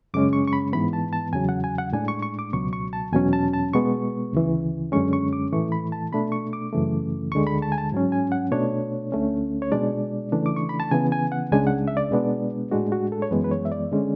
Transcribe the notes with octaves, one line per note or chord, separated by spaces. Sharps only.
F#2 C#3 G#3 C#4 D6
C#6
C#6
B5
G#2 E3 B3 B5
A5
A5
E2 C#3 F#3 G#5
F#5
G#5
F#5
A2 G#3 D4 G#5
C#6
C#6
D6
C#2 B2 F#3 C#6
C#6
A5
E2 B2 F#3 C#4 G#5
A5
A5
B2 G#3 B3 C#6
D2 C#3 E3
F#2 D3 G#3 C#4 C#6
C#6
D6
A2 E3 A3 C#6
B5
A5
B2 A3 D4 B5
C#6
D6
F#2 C#3 E3 A3
D2 D3 G#3 C#6
B5
A5
G#5
A5
G#2 F#3 C#4
G#5
F#5
B2 A3 D4 C#5
D2 D3 A3 C#4
C#5
B2 G#3 D4 D5
C#3 E3 A3 D4
D6
C#6
B5
A5
C#3 E3 B3 G#5
G#5
F#5
C#2 C#3 G#3 D4 G#5
F#5
E5
D5
B2 G#3 B3 D4
A2 G#3 D4 F#4
F#4
A4
C#5
F#2 E3 G#3 B3 B4
B4
C#5
E5
D5
D3 G#3 C#4